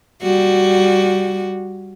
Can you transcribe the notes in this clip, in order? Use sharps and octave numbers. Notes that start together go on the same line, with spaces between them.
G3 F#4